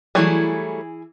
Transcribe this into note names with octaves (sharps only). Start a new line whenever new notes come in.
E3 F#3 G3 A3 E4 G#4